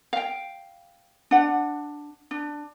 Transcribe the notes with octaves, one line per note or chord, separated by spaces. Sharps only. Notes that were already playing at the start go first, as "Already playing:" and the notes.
F5 G5
D4 F#5
D4